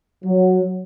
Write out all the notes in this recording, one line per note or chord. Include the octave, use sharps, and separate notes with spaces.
F#3